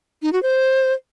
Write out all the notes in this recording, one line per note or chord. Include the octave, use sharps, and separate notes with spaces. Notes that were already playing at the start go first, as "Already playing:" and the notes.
D#4
F#4
C5